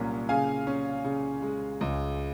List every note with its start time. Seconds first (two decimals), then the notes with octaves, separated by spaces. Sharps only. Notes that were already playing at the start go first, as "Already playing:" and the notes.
Already playing: C2 A#2 F#3 C#4
0.29 C#3 F5 G#5
0.67 C#4
1.04 C#3
1.42 G#3
1.81 C#2